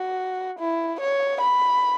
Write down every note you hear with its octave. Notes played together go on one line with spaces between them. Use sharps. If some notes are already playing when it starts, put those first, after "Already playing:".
Already playing: F#4
E4
C#5
B5